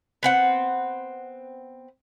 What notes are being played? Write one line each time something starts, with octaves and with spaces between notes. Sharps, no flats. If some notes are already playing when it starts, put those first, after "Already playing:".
B3 C4 F#5